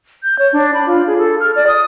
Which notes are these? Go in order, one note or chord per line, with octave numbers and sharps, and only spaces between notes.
G6
C#5
D4
B5
F4
G#4
A4
F6
D5
D#6